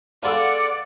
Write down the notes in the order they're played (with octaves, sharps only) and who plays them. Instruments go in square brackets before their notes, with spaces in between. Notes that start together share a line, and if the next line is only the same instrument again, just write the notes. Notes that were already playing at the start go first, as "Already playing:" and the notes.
[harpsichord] B3 G#4 A4 [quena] D5 [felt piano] F5 C6 E6 [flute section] F#5